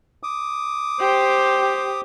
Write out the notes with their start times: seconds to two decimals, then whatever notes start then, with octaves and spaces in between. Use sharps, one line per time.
0.23 D6 D#6
1.00 G4 C5